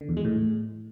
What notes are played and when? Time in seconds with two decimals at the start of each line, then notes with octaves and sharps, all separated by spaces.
0.01 D3
0.09 E2
0.17 G#3
0.25 A2